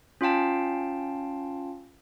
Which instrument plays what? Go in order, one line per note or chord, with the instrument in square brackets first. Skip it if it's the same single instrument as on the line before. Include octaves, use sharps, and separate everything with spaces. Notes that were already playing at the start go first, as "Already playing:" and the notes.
[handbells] C#4 F4 F5 G5 A5